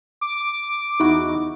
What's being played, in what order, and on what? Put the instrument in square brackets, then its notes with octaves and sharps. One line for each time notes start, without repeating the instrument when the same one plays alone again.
[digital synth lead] D6
[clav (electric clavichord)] E2 E4 F#4 [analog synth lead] D#4